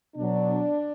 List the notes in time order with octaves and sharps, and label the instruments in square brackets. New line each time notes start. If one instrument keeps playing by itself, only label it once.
[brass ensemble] B2 F#3 D4